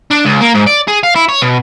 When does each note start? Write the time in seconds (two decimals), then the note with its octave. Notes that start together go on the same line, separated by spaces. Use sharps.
0.11 D4
0.25 C#2
0.41 A#3
0.54 G#2
0.66 D5
0.88 G#4
1.03 F5
1.16 E4
1.29 C#5
1.42 B2